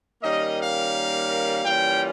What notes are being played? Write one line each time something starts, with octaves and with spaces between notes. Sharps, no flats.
D#3 G3 A#3 C#4 D#5
F5
E3 G3 A#3 C#4 F4 G5